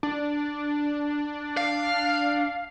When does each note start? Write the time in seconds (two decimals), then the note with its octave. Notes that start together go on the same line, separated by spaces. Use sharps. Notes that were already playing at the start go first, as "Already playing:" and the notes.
0.03 D4
1.57 F5